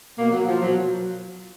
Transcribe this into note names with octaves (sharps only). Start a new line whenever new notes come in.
B2 A#3
F#3
F3
B2 F#3